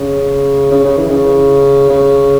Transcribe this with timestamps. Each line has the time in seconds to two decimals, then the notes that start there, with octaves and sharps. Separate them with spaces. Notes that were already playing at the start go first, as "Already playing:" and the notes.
Already playing: C#3
0.72 C#3
0.85 C#3
0.97 E3
1.10 C#3
1.90 C#3